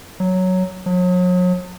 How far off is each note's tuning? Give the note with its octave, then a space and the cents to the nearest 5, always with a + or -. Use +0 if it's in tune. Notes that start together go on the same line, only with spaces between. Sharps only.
F#3 +0
F#3 -40